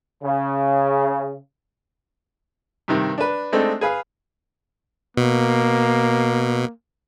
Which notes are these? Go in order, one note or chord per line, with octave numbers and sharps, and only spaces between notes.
C#3
G2 C3 D#3
D4 B4
G#3 A3 C4 D4 D#4 A4
G#4 B4 F5
B2 A#3